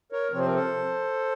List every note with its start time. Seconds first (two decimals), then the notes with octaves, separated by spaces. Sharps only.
0.12 A#4 C#5
0.32 C3 F3 C4 C#5
0.39 C5
0.47 A#4
0.53 A4 C5